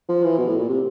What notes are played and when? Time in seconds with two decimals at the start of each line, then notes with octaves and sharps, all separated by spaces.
0.08 F3
0.23 E3
0.38 B2
0.48 A2
0.59 A#2
0.68 C3